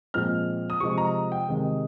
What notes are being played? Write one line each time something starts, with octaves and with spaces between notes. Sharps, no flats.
A#2 F3 G#3 C4 F6
D#6
C3 F3 G#3 C#6
A#5
G5
C3 D#3 G#3